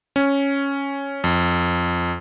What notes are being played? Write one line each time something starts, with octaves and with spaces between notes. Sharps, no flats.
C#4
F2